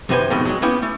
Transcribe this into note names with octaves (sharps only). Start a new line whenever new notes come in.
F#2 C3 D#3 B4 C5 G#5
F2 G#2 B2 D#3
F#3 G#3
A#3 B3 C#4 E4 G5
A3